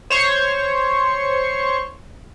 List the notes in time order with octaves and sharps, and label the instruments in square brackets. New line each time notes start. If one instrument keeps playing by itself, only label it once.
[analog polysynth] C5 C#5 C#6